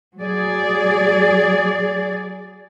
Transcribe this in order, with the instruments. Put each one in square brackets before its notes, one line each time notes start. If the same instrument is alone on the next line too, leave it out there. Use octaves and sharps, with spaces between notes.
[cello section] F#3 G#4 D5